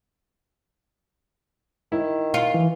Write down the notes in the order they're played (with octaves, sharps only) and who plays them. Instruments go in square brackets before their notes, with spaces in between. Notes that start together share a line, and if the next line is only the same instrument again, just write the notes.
[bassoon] D#3 [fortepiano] E4
[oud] F4
[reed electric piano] E3